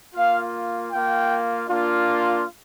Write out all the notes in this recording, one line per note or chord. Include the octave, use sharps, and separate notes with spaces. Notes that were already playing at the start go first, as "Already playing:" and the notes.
A#3 F4 F5
A#3 F4 G5
A#3 D4 F4